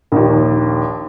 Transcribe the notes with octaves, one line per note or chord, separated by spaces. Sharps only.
A#1 D#2